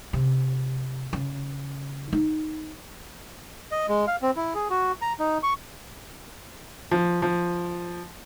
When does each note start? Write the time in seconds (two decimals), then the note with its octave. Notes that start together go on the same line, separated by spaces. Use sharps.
0.13 C3
1.13 C#3
2.13 D#4
3.71 D#5
3.89 G#3
4.07 F5
4.22 C4
4.36 E4
4.55 G#4
4.70 F#4
5.02 A#5
5.19 D#4
5.43 C#6
6.91 F3
7.22 F3